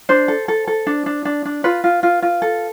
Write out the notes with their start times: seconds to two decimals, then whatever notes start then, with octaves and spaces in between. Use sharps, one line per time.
0.09 D4 C5
0.28 A4
0.48 A4
0.68 A4
0.87 D4
1.06 D4
1.25 D4
1.45 D4
1.64 F4 B4
1.84 F4
2.03 F4
2.22 F4
2.42 A4